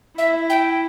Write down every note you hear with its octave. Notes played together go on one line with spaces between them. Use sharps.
E4 E5
G5